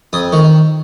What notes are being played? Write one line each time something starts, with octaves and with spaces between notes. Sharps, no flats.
F2 D#6
D#3 C#6